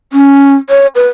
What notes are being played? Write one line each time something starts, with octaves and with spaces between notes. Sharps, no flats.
C#4
C#5
B4